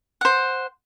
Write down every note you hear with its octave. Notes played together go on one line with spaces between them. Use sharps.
C5 F#5